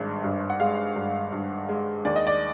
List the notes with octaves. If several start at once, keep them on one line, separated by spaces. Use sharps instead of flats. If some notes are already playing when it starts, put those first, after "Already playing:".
Already playing: G#1 G2 G#3
G2
F#5
G#3 F5
G2
G2
G#3
D#2 D5
D#5
D5